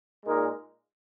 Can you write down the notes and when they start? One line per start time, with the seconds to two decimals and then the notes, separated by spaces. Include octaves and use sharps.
0.25 A#2 G#3 D#4 A#4